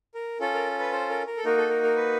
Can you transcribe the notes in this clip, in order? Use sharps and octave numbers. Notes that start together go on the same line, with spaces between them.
A#4
C#4 F4 A4
A#4
B4
C5
A#4
A#4
A4
A#3 D#4 F#4 A#4
A4
A#4
A#4
B4